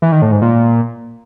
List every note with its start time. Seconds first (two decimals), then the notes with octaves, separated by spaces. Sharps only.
0.02 E3
0.12 D#3
0.22 A2
0.32 G#2
0.42 A#2